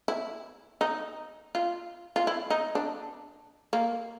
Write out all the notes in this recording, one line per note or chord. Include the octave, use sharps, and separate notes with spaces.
E4
D#4
F4
F4
E4
D#4
D4
A#3